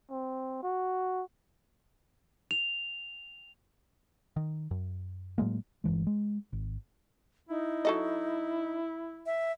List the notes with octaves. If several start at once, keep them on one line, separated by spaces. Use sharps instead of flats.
C4
F#4
F7
D#3
F#2
A2 F#3 G#3 A#3
G1 D2 E3 G#3
G#3
G#1
D#4 E4
F#3 A4 D#5
E5